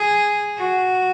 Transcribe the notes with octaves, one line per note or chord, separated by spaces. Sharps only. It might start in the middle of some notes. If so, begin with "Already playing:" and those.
Already playing: G#4
F#4